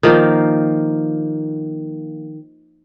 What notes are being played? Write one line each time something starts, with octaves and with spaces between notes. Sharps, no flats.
D#3 F3 A#3